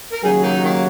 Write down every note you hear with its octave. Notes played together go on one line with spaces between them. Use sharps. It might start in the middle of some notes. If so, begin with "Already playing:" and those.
A#4
D#2 C#3 F#3 D#4 G#4
A#3 D#4
D#3 A#3